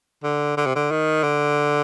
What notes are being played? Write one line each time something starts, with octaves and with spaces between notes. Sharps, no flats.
D3
D3
C3
D3
D#3
D3